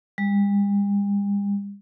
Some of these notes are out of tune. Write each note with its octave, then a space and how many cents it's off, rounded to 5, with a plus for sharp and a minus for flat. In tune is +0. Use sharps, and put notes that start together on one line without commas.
G3 +45